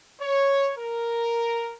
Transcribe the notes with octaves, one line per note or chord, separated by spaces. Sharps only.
C#5
A#4